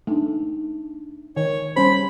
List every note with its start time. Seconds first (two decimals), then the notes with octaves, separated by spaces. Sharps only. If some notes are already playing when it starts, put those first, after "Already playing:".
0.07 A3 D4 D#4
1.37 D#3 C#5
1.76 G3 C#4 C5 B5